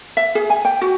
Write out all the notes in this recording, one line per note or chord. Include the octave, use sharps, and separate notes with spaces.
E5
G#4
G#5
G5
F#4